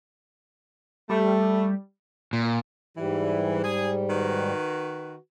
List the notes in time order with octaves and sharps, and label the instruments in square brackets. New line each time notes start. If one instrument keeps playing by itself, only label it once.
[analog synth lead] G3 [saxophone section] A3
[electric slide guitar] A#2
[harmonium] G#2 G3 [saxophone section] E3
[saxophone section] G#4
D#3 F#4 B4